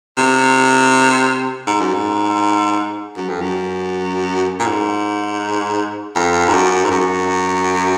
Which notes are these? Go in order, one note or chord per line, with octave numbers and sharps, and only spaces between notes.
C3
G#2
F#2
G#2
F#2
F2
F#2
A#2
G#2
F2
G#2
F#2
G#2
F#2